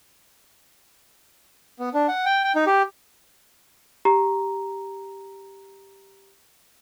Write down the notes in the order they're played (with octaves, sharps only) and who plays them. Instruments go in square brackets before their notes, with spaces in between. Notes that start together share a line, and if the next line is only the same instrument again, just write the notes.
[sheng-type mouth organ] B3
D4
F#5
G5
G5
D#4
G4
[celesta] G4 A#5